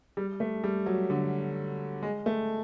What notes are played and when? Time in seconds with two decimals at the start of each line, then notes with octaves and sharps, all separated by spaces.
0.17 G3
0.40 A3
0.64 G3
0.86 F#3
1.10 D3
2.03 G#3
2.26 A3